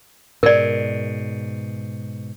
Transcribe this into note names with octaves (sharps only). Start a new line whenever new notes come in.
G#2 B2 A#4 D5